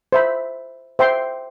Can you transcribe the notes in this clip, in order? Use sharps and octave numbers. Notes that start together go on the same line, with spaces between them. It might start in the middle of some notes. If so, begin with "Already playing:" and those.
C5 E5 B5
C5 E5 G5 C6